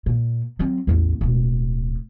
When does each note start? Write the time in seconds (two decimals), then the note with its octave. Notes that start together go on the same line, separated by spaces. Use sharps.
0.06 A#2
0.59 F#3 C4
0.87 A1 E2
1.21 D1 B2